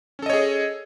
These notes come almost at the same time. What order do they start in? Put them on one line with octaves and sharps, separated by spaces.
C#4 A4 D#5 C#5 G#4